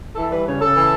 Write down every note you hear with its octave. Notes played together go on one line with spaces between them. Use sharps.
E3 A4
G3 B4
C#3 C#5
C#3 A4
E3